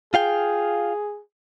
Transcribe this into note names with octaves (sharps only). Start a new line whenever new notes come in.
F4 G#4 F5 G5